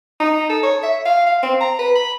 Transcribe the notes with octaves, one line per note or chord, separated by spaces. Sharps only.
D#4
A4
C#5
E5
F5
F5
C4
A#5
B4
B5